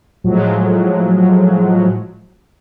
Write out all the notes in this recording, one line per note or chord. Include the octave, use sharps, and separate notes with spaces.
A2 F3 F#3 G#3